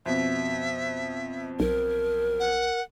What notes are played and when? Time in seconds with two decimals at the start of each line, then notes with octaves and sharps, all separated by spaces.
0.06 F2 B2 E5
1.60 B1 A#4
2.40 F#5